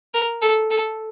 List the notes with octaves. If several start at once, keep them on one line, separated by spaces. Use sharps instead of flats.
A#4
A4
A4